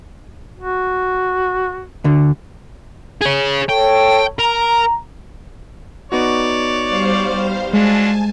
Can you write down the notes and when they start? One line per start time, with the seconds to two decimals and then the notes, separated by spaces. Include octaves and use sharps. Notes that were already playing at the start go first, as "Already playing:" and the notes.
0.58 F#4
2.04 D2 D3
3.21 G#4 C#5
3.69 A4 C#5 G5
4.39 A#4 A#5
6.12 B3 D#4 F#4 C#5 D5
6.88 G3 C5 F5
7.73 F#3 G#3 D4 F4 G#5 A5